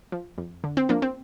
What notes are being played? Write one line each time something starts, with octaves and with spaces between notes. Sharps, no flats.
F3
F2
D3
C4
F3 A#3 D4
C4